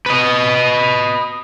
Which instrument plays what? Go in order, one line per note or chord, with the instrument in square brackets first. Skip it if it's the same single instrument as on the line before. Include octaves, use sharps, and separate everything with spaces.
[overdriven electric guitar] B4 D#5